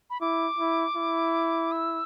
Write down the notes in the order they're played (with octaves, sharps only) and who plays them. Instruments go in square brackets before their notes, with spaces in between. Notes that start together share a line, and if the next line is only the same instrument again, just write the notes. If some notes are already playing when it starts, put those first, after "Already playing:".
[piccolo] B5
[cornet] E4 [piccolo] D6
[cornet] E4
E4
[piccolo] E6